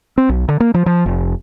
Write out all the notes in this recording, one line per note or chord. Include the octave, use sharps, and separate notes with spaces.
C4
B1
D3
A#3
F3
F3
F1